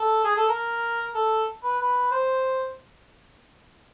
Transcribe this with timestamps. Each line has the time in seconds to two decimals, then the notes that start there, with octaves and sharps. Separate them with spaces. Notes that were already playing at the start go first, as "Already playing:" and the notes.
Already playing: A4
0.24 G#4
0.36 A4
0.49 A#4
1.15 A4
1.63 B4
1.80 B4
2.11 C5